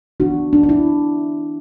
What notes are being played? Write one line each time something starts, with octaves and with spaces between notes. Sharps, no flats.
E3 B3 D4 F#4
D4
D4
E4